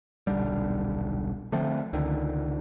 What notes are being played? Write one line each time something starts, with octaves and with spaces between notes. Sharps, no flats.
D#1 B1 D3 G3
D3 F3 A3 C4
C#2 D3 D#3